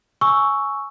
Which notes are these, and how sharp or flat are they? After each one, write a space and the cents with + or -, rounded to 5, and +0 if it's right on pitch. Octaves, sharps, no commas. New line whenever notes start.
G#5 +10 C#6 +5 E6 +0